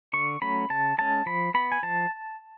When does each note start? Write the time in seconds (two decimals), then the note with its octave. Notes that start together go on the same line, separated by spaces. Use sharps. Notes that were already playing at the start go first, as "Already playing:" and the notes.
0.13 D3 C#6
0.42 F#3 A3 C#4 B5
0.70 C#3 A5
0.98 G#3 C#4 A5
1.26 F3 B5
1.54 B3 B5
1.72 G#5
1.83 F3 A5